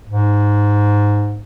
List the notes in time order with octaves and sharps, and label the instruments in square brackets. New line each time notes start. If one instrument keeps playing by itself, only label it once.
[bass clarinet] G#2